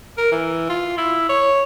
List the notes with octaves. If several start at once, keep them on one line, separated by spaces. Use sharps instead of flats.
A#4
E3
F4
E4
C#5